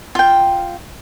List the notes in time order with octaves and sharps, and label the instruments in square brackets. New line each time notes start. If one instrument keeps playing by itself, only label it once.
[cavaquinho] F4 G5